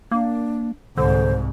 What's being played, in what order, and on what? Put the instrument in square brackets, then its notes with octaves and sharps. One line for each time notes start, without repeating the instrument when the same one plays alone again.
[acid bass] A#3 [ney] D4
[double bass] C2 G#2 [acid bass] D3 [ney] C5